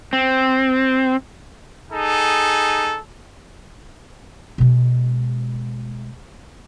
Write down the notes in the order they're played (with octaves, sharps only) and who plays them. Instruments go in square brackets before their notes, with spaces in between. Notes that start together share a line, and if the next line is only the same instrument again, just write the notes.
[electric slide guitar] C4
[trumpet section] D#4 G#4 A4
[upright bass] B2 G#3